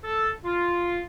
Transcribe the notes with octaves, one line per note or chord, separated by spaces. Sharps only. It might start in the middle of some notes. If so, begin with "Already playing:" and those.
A4
F4